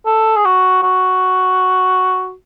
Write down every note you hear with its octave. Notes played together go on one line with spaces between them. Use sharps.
A4
G#4
F#4
F#4